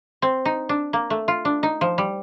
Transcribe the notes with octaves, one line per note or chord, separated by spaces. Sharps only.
C4
D#4
D4
A#3
A3
F4
D4
D#4
F3
G3